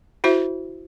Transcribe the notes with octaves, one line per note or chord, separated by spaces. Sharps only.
E4 F#4 C5 E5